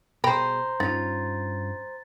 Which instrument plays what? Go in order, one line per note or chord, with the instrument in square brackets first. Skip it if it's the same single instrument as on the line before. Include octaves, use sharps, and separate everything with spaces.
[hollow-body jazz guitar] B2 G#4 [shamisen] G3 G5 B5 [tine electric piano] C5 A#5
[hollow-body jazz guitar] G2 C#4 F4 [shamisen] D#4 [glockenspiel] A6